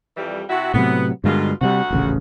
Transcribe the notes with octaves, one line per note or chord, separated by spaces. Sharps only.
F2 E3 G3
C3 E4 F#4
A2 C3 F#3 B3
G2 B2 D3 D#3 G#3 F4
D2 C3 F#3 G3 F#4 F#5
D#1 A1 C#3